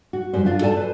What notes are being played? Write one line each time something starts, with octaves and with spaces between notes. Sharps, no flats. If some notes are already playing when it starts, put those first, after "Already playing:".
F#4
F#2 G3 C5
D4 F4 F#4 A#4
A4 C5 D5 G#5 A5
B4 C5